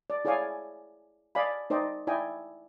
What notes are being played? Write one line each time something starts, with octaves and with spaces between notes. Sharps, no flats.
D5
E4 G#4 C#5 D5 F5 G#5
D5 D#5 F5 G#5 B5
D#4 C5 D5 D#5 G5
E4 D5 D#5 G5 G#5